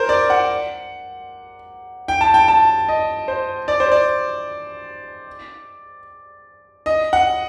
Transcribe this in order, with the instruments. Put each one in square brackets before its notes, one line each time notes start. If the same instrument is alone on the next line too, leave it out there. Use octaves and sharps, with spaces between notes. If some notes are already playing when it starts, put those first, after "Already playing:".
Already playing: [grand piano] A#4 C5
D5
F#5
G5
A5
G5
A5
D#5
C5
D5
C5
D5
D#5
F#5